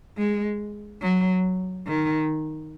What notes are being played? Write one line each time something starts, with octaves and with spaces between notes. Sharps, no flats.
G#3
F#3
D#3